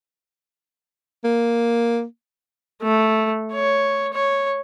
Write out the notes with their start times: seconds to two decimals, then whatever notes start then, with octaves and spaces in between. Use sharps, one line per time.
1.24 A#3
2.82 A3
3.53 C#5
4.13 C#5